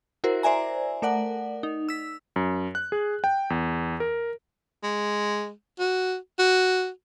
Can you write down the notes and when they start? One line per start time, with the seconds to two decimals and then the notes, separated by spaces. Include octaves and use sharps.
0.24 E4 F#4 A#4 C5
0.43 C5 D5 E5 G#5 A#5
1.02 A3 A#4 D5 F#5
1.63 D#4
1.89 E6 B6
2.36 F#2
2.75 F#6
2.92 G#4
3.24 G5
3.50 E2
4.00 A#4
4.83 G#3
5.79 F#4
6.39 F#4